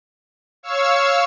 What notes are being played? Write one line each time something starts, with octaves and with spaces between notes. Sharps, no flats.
C#5 F5 C#6 E6